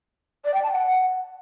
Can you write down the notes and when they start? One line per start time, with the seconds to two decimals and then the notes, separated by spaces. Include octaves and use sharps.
0.44 D5
0.53 G5
0.63 A5
0.72 F#5